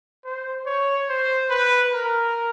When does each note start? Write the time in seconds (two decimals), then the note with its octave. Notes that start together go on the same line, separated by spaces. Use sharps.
0.25 C5
0.66 C#5
1.09 C5
1.50 B4
1.93 A#4